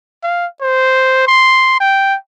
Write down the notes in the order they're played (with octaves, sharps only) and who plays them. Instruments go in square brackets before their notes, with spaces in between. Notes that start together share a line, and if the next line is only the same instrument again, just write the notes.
[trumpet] F5
C5
C6
G5